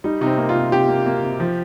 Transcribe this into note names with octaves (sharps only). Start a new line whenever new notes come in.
G3 D#4
C3 D#4
C4
A#3
F4
C3
C3 G4
A#3
A#3
C3
F3